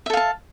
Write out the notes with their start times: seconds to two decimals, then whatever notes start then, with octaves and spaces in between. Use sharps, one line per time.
0.06 E5
0.10 A4
0.13 F5
0.17 A5